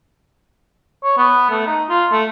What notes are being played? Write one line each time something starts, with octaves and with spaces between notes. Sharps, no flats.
C#5
B3
A3
D#4
F4
A3